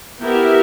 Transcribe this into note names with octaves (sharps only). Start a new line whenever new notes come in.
B3 E4 G4 A#4 E5